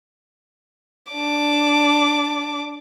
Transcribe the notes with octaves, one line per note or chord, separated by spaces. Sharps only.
D4 D6